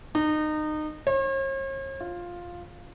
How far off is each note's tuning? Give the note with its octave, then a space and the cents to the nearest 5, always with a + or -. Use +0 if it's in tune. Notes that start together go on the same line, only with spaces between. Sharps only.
D#4 -25
C#5 -45
F4 +5